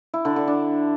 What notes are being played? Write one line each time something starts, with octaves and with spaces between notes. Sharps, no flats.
E4
D3
D3
D4